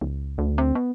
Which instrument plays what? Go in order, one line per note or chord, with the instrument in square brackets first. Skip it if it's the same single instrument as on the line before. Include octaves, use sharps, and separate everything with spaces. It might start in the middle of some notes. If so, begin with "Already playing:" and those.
[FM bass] C#2
[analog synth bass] D2
[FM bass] C4
B3